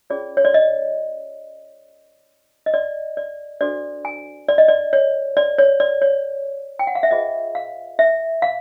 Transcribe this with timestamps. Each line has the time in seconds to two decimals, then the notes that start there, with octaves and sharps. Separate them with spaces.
0.10 C#4 F4 G#4 C#5 D5
0.37 C#5
0.45 D5
0.54 D#5
2.66 D#5
2.74 D5
3.17 D5
3.61 D4 F#4 A4 C5 D5
4.05 G#5
4.49 D5
4.58 D#5
4.68 D5
4.93 C#5
5.37 D5
5.59 C#5
5.80 D5
6.02 C#5
6.79 G5
6.87 F#5
6.95 F5
7.03 E5
7.11 F4 G#4 C5 D#5
7.55 F5
7.99 E5
8.42 F5